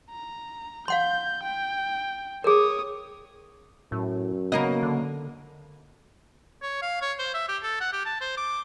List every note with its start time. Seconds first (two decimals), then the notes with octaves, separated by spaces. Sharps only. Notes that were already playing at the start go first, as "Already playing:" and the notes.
0.11 A#5
0.88 F5 F#5 C6 G6
1.43 G5
2.44 G#4 A#4 C#5 D#6
3.92 F#2 A2
4.52 C#3 A#3 B3 D#5
4.83 D3
6.62 C#5
6.82 F5
7.02 C#5
7.19 C5
7.34 E5
7.48 G4
7.63 A4
7.81 F#5
7.92 G4
8.06 A5
8.21 C5
8.37 D6